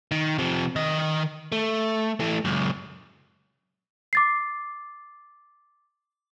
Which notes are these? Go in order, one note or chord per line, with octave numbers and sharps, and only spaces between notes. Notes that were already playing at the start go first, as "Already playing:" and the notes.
D#3
C3 F3
D#3 D#5
A3
E3 A3
C#2 F#2
D6 A6 C7